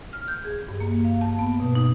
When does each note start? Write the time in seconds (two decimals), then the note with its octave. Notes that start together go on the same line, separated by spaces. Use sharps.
0.13 F6
0.28 G6
0.45 G#4
0.68 G2
0.80 A#3
1.05 F5
1.21 A5
1.39 B3
1.60 B2
1.75 D#4